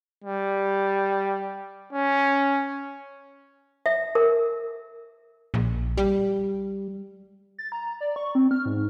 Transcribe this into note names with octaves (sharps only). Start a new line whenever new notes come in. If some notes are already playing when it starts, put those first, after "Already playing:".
G3
C#4
E5
A#4
A#1
G3
A6
A#5
D5
C#6
C4
F6
G#2